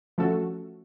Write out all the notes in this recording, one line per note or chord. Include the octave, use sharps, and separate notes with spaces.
F3 A3 C#4 F#4 A4